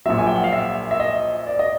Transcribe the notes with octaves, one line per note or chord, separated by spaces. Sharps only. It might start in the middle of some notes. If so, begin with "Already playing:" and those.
A#1 A#2 F#3 E5
G#5
G5
F#5
F5
E5
E5
D#5
D5
D#5